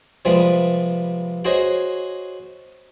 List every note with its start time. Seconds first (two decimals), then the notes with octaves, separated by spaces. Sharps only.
0.25 C3 F3 G3 G#3 B3
1.45 F#4 G#4 C5 C#5 D#5